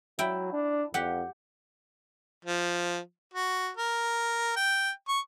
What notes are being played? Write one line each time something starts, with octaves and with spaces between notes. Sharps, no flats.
F#3 E4 G5
D4
F2 G4 F#5
F3
F#4
A#4
G5
C#6